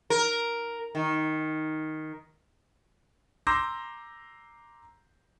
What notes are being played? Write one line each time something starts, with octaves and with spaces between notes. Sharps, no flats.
A#4
D#3
A#5 C6 D6 E6 G6 A#6